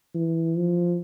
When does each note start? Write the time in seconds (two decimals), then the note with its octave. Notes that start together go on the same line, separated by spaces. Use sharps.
0.15 E3
0.57 F3